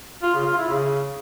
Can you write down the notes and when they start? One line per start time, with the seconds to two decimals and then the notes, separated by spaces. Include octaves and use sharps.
0.23 F4
0.34 C#3
0.46 F4
0.57 E4
0.69 C#3